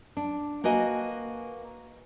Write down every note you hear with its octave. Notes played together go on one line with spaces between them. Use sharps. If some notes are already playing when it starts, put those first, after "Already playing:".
D4
A#3 F#4 B4 D#5 G#5